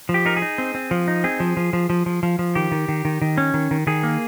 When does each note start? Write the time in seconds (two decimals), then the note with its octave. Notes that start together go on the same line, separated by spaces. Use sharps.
0.09 F3
0.14 G4
0.25 D#4 A#4
0.37 G#4
0.42 D#4
0.58 C4
0.75 C4
0.91 F3
1.08 D#4
1.24 C4 G#4
1.40 F3
1.57 F3
1.73 F3
1.90 F3
2.06 F3
2.23 F3
2.39 F3
2.55 D#3 G4
2.72 D#3
2.88 D#3
3.05 D#3
3.22 D#3
3.38 C#4
3.54 D#3
3.71 D#3
3.87 D#3 G#4
4.03 A#3